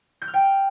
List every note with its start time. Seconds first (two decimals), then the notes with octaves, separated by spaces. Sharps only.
0.22 G6
0.28 F6
0.34 G5